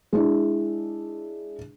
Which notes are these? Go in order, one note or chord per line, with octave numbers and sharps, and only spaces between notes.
G#3 D4 E4